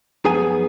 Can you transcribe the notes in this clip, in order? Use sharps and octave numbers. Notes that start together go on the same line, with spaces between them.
F#2 F3 B3 D#4 G#4 G#5